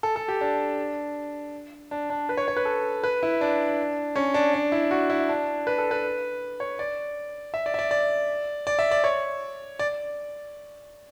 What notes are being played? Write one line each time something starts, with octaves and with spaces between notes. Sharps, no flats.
A4
A4
G4
D4
D4
D4
B4
C#5
C#5
B4
A4
B4
E4
D4
C#4
D4
D4
E4
F#4
E4
D4
B4
A4
B4
C#5
D5
E5
D5
E5
D5
D5
D5
E5
D5
C#5
D5